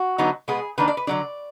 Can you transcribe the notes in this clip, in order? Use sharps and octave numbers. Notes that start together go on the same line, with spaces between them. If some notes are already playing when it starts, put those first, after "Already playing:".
Already playing: F#4
D3 F#3 B3 D#4
B2 G#3 B3 G#4
D#3 A#3 D4 B4
D5
B4
D3 F#3 D4 D5